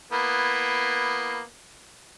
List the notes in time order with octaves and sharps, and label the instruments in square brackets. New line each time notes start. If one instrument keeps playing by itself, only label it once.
[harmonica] A#3 B3 E4